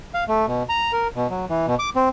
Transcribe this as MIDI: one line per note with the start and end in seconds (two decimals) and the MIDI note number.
0.14 0.24 77
0.28 0.46 57
0.47 0.63 47
0.69 0.92 82
0.93 1.08 70
1.15 1.27 47
1.30 1.45 54
1.49 1.66 52
1.67 1.75 47
1.79 1.90 86
1.96 2.09 60